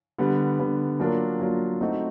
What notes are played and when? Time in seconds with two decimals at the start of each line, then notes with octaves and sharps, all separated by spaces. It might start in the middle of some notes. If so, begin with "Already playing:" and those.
0.19 D3 G3 B3
0.59 D3 G3 B3
0.99 F#3 A#3 D4 F4 A#4
1.40 F#3 A#3 D4 F4 A#4
1.81 A3 C4 D#4 F#4